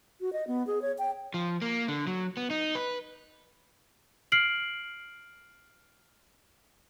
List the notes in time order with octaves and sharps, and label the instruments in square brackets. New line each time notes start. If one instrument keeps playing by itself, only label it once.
[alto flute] F#4
D#5
B3
G#4
C#5
G5
[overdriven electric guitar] F3
A#3
D3
F#3
B3
D#4
B4
[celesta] F6 C7 D7 F#7